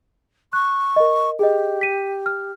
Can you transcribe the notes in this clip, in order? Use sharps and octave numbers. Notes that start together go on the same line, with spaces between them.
C#6 F#6
A#4 D#5
G4 G#4 D#5
B6 D#7
F6